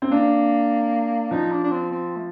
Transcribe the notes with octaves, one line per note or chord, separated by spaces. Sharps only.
C4
A#3 D4
F3 D#4
D4
D4
C4
C4
A3